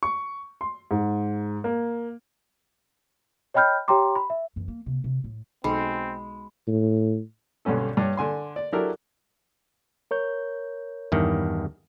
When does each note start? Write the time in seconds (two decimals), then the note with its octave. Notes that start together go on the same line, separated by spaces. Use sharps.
0.03 C#6
0.61 C6
0.91 G#2
1.64 A#3
3.54 C#5 D#5 G5 B5 F6 G6
3.88 G4 C#5 G5 A#5 C6 D6
4.16 B5
4.30 E5
4.56 F#2 E3
4.68 A#3
4.86 C3 A#3
5.04 C3
5.24 A2
5.64 B1 G#3 C4 B5
6.67 A2
7.65 B1 G2 D3 C#4 A4
7.97 G2 G3 C#5
8.17 D3 G#5 C6
8.56 D5
8.72 F#3 D4 E4 G4 A4 A#4
10.11 A#4 C#5 G6
11.12 E2 G2 D#3